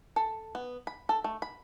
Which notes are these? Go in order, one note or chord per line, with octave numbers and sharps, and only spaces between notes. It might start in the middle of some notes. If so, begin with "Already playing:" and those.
A4
B3
B5
A4
A3
B5